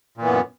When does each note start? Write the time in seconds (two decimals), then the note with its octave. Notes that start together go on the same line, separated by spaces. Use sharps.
0.17 A#2
0.22 E3
0.26 B3
0.30 F#2